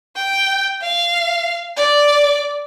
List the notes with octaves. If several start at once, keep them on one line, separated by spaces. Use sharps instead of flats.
G5
F5
D5